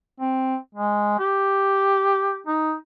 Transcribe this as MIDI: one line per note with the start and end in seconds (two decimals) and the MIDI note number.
0.20 0.56 60
0.75 1.19 56
1.19 2.40 67
2.47 2.74 63